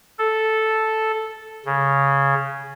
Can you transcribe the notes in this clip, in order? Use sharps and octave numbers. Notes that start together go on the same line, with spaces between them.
A4
C#3